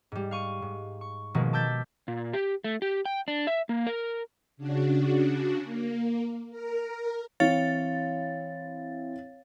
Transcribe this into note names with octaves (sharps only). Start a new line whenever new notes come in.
G#2 G3
F5 C#6 D#7
G#2
C#6
B2 D#3 F3 G#3 A#3
A5 D6 E6 G6 A6 B6
A#2
G4
A3
G4
G5
D4
E5
A#3
A#4
C#3 D4 F#4
A#3
A#4
E3 C4 E4 C#5 F5 A6